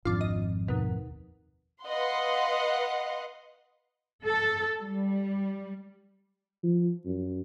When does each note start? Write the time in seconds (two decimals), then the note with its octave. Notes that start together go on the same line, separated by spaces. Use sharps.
0.05 G#1 F2 D4 F4
0.21 D#5
0.68 D#2 B2
1.84 B4 D#5 F5 F#5 C6
4.24 A4
4.81 G3
6.63 F3
7.05 F#2